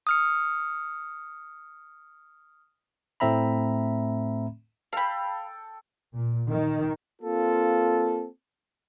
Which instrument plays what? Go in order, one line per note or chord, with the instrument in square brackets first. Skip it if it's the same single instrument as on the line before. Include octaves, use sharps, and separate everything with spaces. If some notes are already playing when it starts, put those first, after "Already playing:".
[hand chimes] D#6 F6 C#7
[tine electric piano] A2 A3 C4 E5 A#5 B5
[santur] A4 G5 [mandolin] F5 B5
[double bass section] A#2
D#3
[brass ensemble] A#3 C4 F4 A4